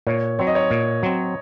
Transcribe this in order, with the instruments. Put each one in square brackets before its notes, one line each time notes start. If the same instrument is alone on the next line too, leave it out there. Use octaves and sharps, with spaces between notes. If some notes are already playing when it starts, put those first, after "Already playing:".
[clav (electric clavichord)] A#2 [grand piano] C#5
[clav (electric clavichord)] F#3 C4 [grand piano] C#5
[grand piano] D#5
C#5
[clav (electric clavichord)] A#2
F#3 C4